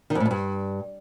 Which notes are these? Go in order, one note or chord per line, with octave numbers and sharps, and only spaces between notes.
D#3
F2
A2
F2
G2